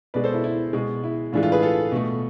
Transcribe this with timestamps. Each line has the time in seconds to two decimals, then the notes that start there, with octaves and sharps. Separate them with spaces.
0.14 B2 G#3 B4 D5
0.24 A4 C5
0.34 E4
0.44 E4
0.73 B2 G#3
1.04 E4
1.33 A2 E3 G#3 D4 F4
1.43 F4 A4
1.52 G#4 B4
1.62 F4 A4
1.92 B2 A3